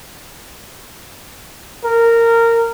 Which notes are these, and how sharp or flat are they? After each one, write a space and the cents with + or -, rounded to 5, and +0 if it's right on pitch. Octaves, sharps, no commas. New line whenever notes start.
A#4 -15